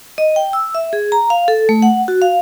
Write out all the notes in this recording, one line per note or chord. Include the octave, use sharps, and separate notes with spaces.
D#5
G5
E6
E5
G#4
A#5
F5
A4
A3
F#5
F#4
F5